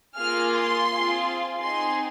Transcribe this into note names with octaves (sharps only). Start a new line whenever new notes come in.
A#3 F4 G#4 F6
C6
C4 F4 G#4
C4 D#4 G#4 C6